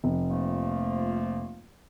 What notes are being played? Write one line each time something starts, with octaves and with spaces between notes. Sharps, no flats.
F1
F3 A3 A#3